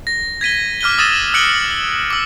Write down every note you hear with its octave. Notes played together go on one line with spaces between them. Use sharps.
A#6
G#6 B6 D#7 G7
D6 F6 F#6 D#7 G7
D#6 E6 A6 A#6 D#7 E7
E6 F#6 C#7 D7 F#7 G7
D6 E6